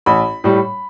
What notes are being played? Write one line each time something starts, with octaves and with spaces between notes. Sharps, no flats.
A1 B5
A2 G3